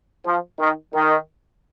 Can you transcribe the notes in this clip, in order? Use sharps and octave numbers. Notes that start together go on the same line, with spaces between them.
F3
D#3
D#3